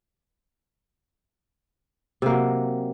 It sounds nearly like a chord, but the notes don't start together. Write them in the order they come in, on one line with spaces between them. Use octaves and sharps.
C3 A#3 F#3